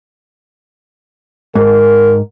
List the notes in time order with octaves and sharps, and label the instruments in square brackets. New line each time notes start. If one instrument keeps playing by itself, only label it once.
[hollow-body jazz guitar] G#2 [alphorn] A#4